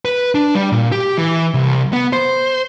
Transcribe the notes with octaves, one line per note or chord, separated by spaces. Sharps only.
B4
D4
G3
A#2
G4
E3
C2
B3
C5